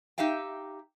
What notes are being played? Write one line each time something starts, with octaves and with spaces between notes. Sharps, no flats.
D#4 G4 E5 F5 G5